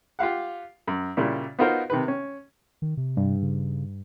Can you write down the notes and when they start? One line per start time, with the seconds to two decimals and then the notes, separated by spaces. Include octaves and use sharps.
0.19 F4 G4 F5 F#5
0.87 F#2
1.17 A#2 C#3 G3 E4
1.59 B3 D#4 F4 F#4 A#4 C5
1.90 C3 D#3 B4
2.08 C#4
2.82 D#3
2.97 C3
3.17 G2
3.42 C#3